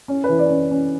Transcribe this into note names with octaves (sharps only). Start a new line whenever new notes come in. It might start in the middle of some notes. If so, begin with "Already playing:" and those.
C#4
B4
E3
D5
C#4
C#4